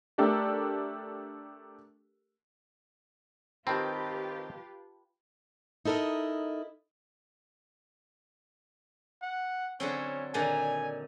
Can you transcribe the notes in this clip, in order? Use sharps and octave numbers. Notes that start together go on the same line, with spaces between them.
A3 D4 G4 A4 A#4
D#3 C4 F4 G4 B4 G5 A5 B5
D#4 E4 A4 A#4 D#5
F#5
D3 F#3 C4 C#4
A#2 D3 D#3 G#5